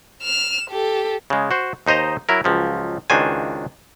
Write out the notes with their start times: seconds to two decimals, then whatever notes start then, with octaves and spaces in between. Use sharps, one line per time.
0.23 F6 E7
0.70 G4 A4
1.30 C#3 G#3
1.51 F#4 C5
1.86 D#2 D#4 C5 D#5 A#5
2.29 F#3 E4 A#4
2.44 C#2 F3 F#3
3.10 C#2 D#3 D4 F#4 C5 G#5